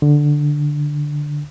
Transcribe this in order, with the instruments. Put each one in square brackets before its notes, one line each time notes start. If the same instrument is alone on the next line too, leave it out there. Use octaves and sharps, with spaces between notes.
[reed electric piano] D3